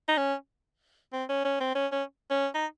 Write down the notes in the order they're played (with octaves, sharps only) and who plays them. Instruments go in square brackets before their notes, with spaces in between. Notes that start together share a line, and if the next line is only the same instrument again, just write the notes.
[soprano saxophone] D#4
C#4
C4
C#4
C#4
C4
C#4
C#4
C#4
D#4